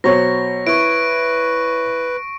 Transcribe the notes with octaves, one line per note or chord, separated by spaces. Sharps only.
B2 F#3 C5 C#5 C#6 A#6
E4 B4 C#6 D7